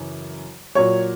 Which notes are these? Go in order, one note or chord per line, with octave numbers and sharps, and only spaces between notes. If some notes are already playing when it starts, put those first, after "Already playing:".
Already playing: F#2 C#3 E3
A#2 F#3 C#5